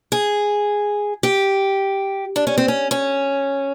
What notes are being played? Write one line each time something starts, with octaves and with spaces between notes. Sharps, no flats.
G#4
G4
D4
C#4
C4
C#4
C#4